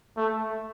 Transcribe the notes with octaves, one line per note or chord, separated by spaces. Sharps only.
A3